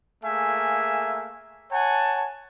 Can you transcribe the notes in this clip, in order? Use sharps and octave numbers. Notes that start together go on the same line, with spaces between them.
A3 A#3 G#4 E5 F5 G#5
C#5 F#5 G#5 A5